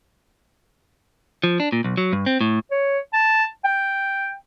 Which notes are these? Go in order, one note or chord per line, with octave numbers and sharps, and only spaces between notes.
F3
D4
A#2
B1
F#3
G2
C4
A2
C#5
A5
G5